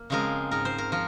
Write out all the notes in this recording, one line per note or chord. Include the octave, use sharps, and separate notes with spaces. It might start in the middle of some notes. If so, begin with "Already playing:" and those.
Already playing: A#3
C#3 F3 G#3 C4 A#4
G#2 A#4
C5
A#4
F3 A#4